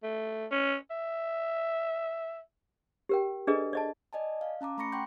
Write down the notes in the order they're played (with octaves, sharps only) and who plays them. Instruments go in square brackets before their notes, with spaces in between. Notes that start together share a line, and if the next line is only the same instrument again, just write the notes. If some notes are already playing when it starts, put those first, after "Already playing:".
[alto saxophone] A3
C#4
E5
[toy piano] G4 A#4 G5
D4 G#4 A4 B4 D5 D#5
D5 D#5 A5
[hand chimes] D5 D#5 G#5 A5
F5
C#4 A5 A#5 D6
A3 A#5 B5 C#6 A#6 C#7
F#5 G5 C6 C#6 G6